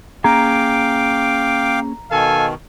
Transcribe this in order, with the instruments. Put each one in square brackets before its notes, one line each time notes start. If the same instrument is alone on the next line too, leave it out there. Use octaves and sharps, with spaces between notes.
[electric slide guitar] A#3 C#4 G#4 [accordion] F5 G5 D6 [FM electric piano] A#5
[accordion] B2 D#3 [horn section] A4 F5 G#5